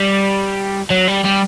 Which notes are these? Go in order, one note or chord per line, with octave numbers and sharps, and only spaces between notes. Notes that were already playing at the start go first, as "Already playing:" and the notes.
Already playing: G3
F#3
G3
G3